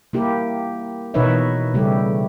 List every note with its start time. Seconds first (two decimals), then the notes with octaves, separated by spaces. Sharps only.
0.13 A#3 E4 G4 A#4
1.14 B2 E3 D#4 B4 C#5 E5
1.74 C#3 G3 A3 G4